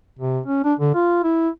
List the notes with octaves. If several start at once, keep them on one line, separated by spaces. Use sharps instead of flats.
C3
C#4
D4
D3
F4
E4